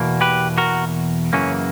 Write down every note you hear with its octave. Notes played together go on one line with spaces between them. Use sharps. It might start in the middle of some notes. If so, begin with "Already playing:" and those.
Already playing: E2 B2 A#3
G4 B4
F#4 A#4
F#2 C#3 E3 A#3 C#4